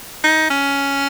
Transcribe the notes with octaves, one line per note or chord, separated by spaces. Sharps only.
D#4
C#4